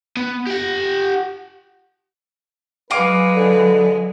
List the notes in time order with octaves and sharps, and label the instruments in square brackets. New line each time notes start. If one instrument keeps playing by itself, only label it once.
[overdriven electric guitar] B3
G4 F#5
[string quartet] F#3 G#3 [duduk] B4 [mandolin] F5 G#5 D6
[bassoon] D3